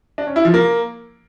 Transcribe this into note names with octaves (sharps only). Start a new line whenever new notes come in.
D4
C#4
E4
F3
A#3